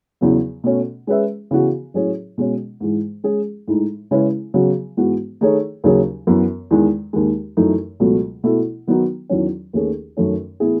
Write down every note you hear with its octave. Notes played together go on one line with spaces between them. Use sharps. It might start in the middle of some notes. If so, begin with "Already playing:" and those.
E2 C#3 F#3 B3
B2 A3 C#4
G#3 C#4 G#4 B4 E5
C#3 E3 B3 F#4
A2 F#3 C#4 G#4 C#5
B2 G#3 C#4
G#2 E3 G#3
G#3 C#4 G#4
A2 G#3 D#4
C#3 G#3 C#4 E4 B4
C#3 F#3 B3 F#4
G#2 E3 G#3 B3 F#4
D#3 A3 D#4 G#4 C#5
D#2 C#3 F#3 C#4 G#4
F#2 E3 B3
E2 D#3 G#3
D#2 D#3 G#3
F#2 E3 A3 D#4
C#2 B2 F#3 A3
B2 A3 E4 A4
D#3 F#3 B3 D#4 F#4
E2 D#3 F#3 C#4
D#2 D#3 A3 C#4 G#4
F#2 D#3 A3 C#4
A2 E3 B3 E4 G#4